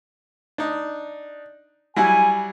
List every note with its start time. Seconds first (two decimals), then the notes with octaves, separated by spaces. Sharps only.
0.58 D4 D#4
1.96 F#3 G3 E4 G#5